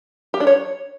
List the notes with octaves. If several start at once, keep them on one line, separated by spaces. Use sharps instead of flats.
G4
D4
C#5